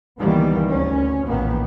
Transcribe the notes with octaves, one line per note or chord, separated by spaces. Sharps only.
C#2 D#3 E3 G3 A#3 B3
G1 D2 C#4
A#1 E2 A2 D#3 A#3 B3